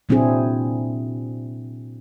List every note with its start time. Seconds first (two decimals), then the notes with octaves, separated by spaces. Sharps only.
0.09 A#2 F#3 C4 D4 E4 G#4